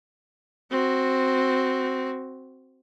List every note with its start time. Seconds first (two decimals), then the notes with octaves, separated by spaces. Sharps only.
0.71 C4 F#4